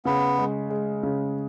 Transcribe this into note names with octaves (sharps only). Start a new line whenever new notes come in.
C#3 B3
G#3
G#3
C#3